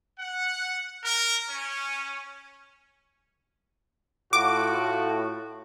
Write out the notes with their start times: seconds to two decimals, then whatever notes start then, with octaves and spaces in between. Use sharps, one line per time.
0.19 F#5
1.04 A#4
1.50 C#4
4.33 A2 F4 F#4 D6